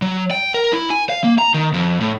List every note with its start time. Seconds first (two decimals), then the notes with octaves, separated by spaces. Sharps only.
0.02 F#3
0.31 G5
0.54 A#4
0.73 E4
0.90 G#5
1.09 F5
1.24 A#3
1.38 A#5
1.54 D#3
1.74 F2
2.00 A2